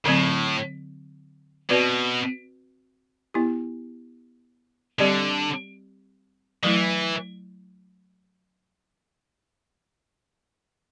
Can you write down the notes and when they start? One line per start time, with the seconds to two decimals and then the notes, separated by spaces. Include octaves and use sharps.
0.05 A2 D3 F#3 C4
1.70 B2 C4 F#4 B4 D5
3.34 B3 E4 G4
4.99 D3 G3 C4 G4 D5
6.63 E3 F#3 A3 E4